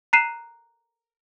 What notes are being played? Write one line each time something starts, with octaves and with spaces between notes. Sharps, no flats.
A#5 F#6 C7 D#7 E7